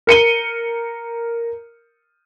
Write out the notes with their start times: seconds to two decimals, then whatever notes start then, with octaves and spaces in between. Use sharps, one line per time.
0.07 A#4 C#7 D#7 G7